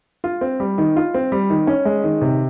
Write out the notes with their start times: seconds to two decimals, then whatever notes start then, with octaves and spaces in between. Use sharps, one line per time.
0.24 F4
0.41 C4
0.60 G3
0.78 D#3
0.96 F4
1.14 C4
1.32 G3
1.50 D#3
1.67 C#4
1.85 G#3
2.04 D#3
2.22 C3